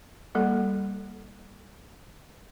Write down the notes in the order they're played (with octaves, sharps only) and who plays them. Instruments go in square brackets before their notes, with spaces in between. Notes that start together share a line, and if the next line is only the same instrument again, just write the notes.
[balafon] G3 A#3 A4